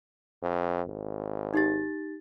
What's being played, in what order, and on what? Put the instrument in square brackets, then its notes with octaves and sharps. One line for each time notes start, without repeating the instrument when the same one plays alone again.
[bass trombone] F2
G#1
[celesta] D#4 G4 A6